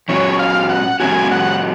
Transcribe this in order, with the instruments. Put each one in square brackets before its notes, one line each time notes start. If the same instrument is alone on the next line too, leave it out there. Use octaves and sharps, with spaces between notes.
[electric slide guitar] A#2 F#3 C#4 F#4 [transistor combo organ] C#5
[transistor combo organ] F5
F#5
[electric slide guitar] A#2 F#3 C#4 F#4 [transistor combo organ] G#5
[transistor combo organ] F#5